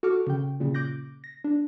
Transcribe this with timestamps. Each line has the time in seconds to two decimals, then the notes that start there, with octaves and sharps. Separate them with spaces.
0.03 F#4 A4 C#6 D6 F6
0.27 C#3 G5
0.60 A#2 C#3
0.74 D6 F#6 G6 A#6
1.24 A#6
1.44 D4